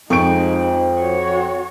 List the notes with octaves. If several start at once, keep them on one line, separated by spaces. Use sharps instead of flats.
F2 F3 G#3 D#4 C#6 D7
F#4 C#5